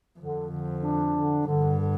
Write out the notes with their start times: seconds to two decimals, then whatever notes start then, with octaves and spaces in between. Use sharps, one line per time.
0.19 F2 D3
0.50 D3
0.83 D4
1.15 D3
1.46 G2 D3
1.78 D3